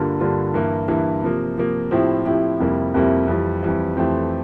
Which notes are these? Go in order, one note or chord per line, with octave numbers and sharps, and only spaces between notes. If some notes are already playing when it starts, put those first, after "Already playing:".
Already playing: G2 D3 G3 A#3 F4
G2 D3 G3 A#3 F4
G2 E3 A#3 E4
G2 E3 A#3 E4
C3 F3 A#3
C3 F3 A#3
A2 F3 C4 E4 G4
A2 F3 C4 E4 G4
F2 C3 G3 A#3 E4
F2 C3 G3 A#3 E4
F2 E3 G3
F2 E3 G3
F2 E3 A3 C4 G4